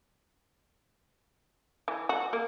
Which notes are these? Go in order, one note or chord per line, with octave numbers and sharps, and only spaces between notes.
E3
F#4
A#3